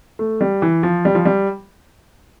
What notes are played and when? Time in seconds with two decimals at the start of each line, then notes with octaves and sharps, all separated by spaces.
0.19 A3
0.41 G3
0.62 E3
0.83 F3
1.05 G3
1.15 F3
1.25 G3